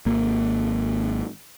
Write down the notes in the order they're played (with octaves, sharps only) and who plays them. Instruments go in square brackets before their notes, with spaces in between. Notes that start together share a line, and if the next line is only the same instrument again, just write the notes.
[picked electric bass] G#1 A#3